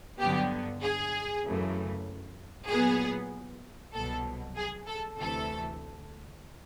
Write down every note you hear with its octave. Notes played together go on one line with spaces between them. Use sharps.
G2 D3 F#3 B3 G4
G#4
F#2 C#3 E3 A3
A#2 F#3 B3 G#4
C2 B2 F#3 A4
G#4
A4
D2 C3 E3 A3 A4